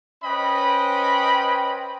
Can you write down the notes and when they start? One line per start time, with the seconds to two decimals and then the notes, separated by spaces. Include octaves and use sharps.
0.24 C#4 B4 C5 D#5 G5 B5